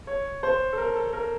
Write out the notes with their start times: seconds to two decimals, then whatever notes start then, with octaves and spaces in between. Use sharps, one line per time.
0.07 C#5
0.43 C5
0.73 A4
0.78 A#4
0.96 A4
1.13 A#4